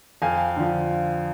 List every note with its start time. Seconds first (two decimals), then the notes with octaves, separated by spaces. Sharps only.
0.22 F2 F5 G#5
0.57 D3 F3